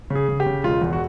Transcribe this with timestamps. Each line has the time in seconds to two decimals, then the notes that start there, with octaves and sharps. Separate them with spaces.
0.10 C#3
0.15 G#4
0.29 C#3
0.40 G4
0.46 C#3
0.63 E1 F4
0.82 E2
0.93 F#4